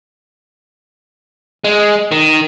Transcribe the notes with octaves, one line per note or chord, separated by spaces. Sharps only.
G#3
D#3